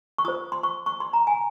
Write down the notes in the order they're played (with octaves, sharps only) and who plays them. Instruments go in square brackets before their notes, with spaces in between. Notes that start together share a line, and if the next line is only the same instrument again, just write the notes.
[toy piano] C#6
F4 C5 D#6
C6
C#6
C#6
C6
A#5
G#5